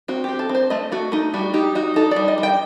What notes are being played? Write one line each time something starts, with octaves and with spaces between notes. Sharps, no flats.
C4 F#4
C4 G4
A4
C4
C5
A3 D#5
A3 F#4
A3 D#4
G3 F#4
D#4 G4
D#4 F#4
D#4 A4
D5
G3
D#5
G3
G5